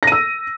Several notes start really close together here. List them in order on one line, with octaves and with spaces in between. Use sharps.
A#6 D#7 E6